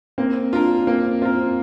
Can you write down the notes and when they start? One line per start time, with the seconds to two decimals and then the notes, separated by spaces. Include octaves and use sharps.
0.18 A#3 C4
0.53 D4 F4 A#4
0.87 A#3 C4
1.22 C4 F4 A#4